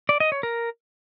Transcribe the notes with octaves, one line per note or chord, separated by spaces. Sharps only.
D5
D#5
C#5
A#4